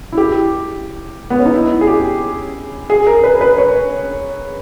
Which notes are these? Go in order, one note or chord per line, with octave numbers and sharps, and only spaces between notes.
E4
G4
B3
C#4
D#4
E4
G#4
G4
G#4
A#4
B4
B4
C#5